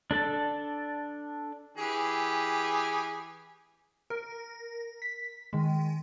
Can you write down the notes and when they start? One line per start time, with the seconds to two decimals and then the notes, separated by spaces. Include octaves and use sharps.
0.11 D4 A4 A5
1.77 E3 G4 G#4
4.10 A#4
5.02 B6
5.53 D#3 G#3